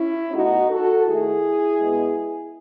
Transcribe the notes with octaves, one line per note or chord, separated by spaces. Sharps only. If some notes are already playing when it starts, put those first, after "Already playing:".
Already playing: C#4 E4
B2 A3 D#4 F#4
F#4 A4
D#3 A3 E4 G#4
B2 G#3 B3